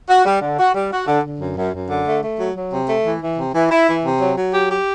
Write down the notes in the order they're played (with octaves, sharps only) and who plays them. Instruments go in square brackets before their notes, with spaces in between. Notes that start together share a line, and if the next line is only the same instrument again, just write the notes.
[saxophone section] F#4
G3
D3
F#4
G3
F#4
D3
D3
F#2
F#2
F#2
D3
A3
A3
F#3
F#3
C3
A3
E3
E3
C3
E3
E4
E3
C3
F#3
F#3
G4
G4